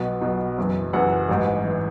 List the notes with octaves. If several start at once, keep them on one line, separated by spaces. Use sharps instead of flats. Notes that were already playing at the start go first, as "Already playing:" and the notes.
Already playing: B1 B2
B1 B2
F#1 F#2 E3
F#1 F#2 E3 F#5
A1 G#2 E3
E3